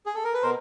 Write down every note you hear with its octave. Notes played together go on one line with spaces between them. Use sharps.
G#4
A4
A#4
B4
B2 A#4 C5